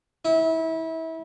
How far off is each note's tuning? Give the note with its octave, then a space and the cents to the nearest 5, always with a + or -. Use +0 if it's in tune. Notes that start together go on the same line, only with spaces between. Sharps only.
E4 -30